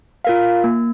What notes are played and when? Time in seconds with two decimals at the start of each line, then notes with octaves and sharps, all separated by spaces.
0.25 F4 A#4 F5
0.64 A#3